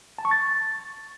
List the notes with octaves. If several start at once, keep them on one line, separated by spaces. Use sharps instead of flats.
A5
C#6
A6